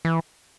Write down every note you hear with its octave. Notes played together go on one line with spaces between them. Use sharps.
E3